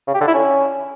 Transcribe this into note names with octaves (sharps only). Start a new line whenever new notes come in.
C#3
G4
D3
E4
C#4